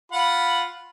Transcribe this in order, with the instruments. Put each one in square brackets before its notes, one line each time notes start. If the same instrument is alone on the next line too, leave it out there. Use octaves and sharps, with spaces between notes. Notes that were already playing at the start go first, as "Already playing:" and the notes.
[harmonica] F4 F#5 B5